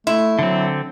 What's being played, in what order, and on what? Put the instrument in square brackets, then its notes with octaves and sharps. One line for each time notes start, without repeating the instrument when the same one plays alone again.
[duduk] A3 [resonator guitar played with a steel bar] E4
[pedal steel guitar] D3 C4 [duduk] F#3